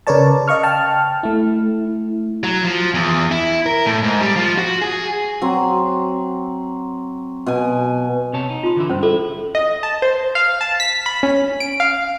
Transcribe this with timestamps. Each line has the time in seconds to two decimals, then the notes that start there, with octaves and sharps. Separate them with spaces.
0.07 C#3 A#4 B4 C#5 D5 A5
0.48 D#5 F5 C#6 F6
0.63 G5 A5 F6
1.23 A3 E4
2.44 F#3
2.65 F3
2.94 E2
3.31 E4
3.66 A#4
3.86 A2
4.03 G#2
4.21 G3
4.36 F3
4.58 F#4
4.82 G#4
5.41 F#3 C4
7.46 B2 G#5
8.33 C3 C#5 A5
8.50 D#4
8.63 F4 C6
8.76 D3 E3 E4
8.90 G2 C#4 C5
9.03 E4 A4
9.55 D#5
9.83 A5
10.02 C5
10.35 F5
10.61 A5
10.80 B6
11.06 B5
11.23 C#4
11.60 D7
11.80 F5